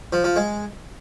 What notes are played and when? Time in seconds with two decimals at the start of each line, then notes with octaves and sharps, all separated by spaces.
0.13 F3
0.24 F3
0.36 G#3